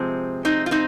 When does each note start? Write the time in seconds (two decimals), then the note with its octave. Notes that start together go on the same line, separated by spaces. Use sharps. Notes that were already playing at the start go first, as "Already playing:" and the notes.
Already playing: C3 F3 G#3 C4
0.45 C4 D#4
0.66 F4
0.71 C4 D#4